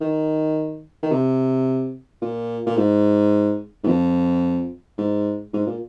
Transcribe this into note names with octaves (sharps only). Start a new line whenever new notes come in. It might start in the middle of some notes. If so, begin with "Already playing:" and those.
D#3
D#3
C3
A#2
A#2
G#2
G#2
F2
G#2
G#2
A#2